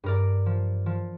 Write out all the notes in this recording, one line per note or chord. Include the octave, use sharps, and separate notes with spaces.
G2 A#4 D5
F3
F3